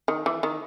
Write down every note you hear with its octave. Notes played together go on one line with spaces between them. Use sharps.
D#3
E3
D#3